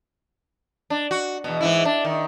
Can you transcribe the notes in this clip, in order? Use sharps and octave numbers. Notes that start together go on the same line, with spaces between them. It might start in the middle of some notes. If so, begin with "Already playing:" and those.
D4
F#4
E2 B2
G#2 E3 E4
D4
D#3